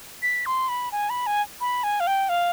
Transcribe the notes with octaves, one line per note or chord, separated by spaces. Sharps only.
B6
C6
B5
G#5
B5
G#5
B5
G#5
F5
G5
F5